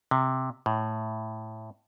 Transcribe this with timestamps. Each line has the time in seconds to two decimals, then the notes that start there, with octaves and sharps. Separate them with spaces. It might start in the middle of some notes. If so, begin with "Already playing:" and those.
0.11 C3
0.66 A2